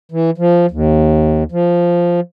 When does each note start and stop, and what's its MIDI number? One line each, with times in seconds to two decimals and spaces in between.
0.12 0.30 52
0.38 0.66 53
0.71 1.44 39
1.52 2.20 53